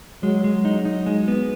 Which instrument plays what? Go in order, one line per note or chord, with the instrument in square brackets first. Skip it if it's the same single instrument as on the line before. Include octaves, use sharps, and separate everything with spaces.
[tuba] F#3 [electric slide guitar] G#3
[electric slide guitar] G#3
D#4
D#4
G#3
B3